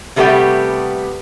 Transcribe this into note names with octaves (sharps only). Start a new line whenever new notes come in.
C3 G3 A3 B3 G4 G5